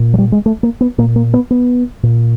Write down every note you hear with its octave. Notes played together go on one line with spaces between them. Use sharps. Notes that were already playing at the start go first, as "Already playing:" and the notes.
Already playing: A#2
F#3
G3
G#3
A3
A#3
B3
A#2 A#3
A#3
B3
B3
A#2